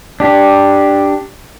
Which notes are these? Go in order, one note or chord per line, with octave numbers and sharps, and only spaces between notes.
D4 G4